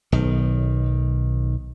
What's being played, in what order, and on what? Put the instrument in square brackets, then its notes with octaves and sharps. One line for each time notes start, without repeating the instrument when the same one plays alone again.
[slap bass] B1 D#3